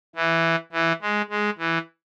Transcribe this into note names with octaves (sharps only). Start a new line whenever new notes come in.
E3
E3
G#3
G#3
E3